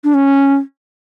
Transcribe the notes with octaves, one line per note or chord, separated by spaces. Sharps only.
D4
C#4